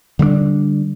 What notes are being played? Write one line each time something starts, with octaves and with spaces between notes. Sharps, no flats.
D3 G3 A3 D4